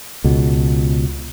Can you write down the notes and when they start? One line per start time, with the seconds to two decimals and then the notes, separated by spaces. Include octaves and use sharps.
0.24 C#2 B2